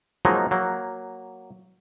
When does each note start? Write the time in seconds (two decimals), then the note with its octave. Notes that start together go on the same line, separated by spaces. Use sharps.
0.25 F3 F#3 G#3 A#3 D#4
0.51 F#3 A#3